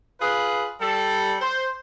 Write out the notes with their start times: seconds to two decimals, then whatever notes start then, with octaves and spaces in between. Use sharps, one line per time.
0.21 F4 G#4 B4
0.81 G3 A4
1.40 C5